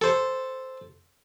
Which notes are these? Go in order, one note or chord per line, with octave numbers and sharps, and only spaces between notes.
A4 C5